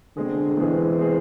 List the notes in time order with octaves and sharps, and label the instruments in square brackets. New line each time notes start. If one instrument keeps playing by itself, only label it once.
[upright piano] B2 G#3 C4 G#4 [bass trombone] D3
[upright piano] B2 G#3 C4 G#4 [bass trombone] E3
[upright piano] B2 G#3 C4 G#4